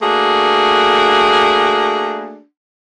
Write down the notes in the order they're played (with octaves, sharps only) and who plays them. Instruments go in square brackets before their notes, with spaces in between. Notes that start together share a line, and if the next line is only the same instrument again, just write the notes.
[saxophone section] A3 A#3 D4 F#4 G#4